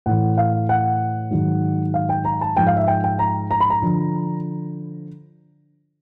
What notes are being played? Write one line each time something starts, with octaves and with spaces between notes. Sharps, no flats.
A2 E3 F#5
F5
F#5
G#2 D#3 F#3
F5
G5
A#5
A5
G#2 F3 G5
F5
E5
G5
G5
A#5
A#5
B5
A#5
D3 F3